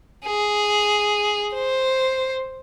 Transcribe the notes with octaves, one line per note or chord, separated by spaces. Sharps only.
G#4
C5